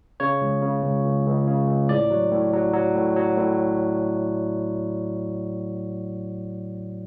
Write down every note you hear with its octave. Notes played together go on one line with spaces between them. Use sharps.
C#3 C#5
C#2
C#3
C#2
C#2
C#2
C#3
C#2
A2 D5
F#3
A2
F#3
F#3
A2
F#3
A2